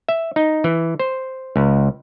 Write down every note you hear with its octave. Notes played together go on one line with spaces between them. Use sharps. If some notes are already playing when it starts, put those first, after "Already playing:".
E5
D#4
E3
C5
C#2